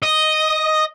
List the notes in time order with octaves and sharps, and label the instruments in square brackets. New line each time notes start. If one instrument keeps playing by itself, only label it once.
[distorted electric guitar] D#5